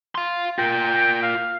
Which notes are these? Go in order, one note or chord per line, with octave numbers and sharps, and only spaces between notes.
F5 C6
F4 A#4 G5
F5